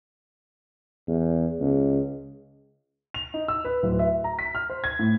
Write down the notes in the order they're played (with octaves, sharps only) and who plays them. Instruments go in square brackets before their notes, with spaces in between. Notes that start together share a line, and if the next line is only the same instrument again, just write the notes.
[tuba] E2
C#2
[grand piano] F7
D#4
E6
B4
D1
E5
A#5
B6
F6
C5
G#6
A2